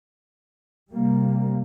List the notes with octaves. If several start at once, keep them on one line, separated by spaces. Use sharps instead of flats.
C3 G3 A#3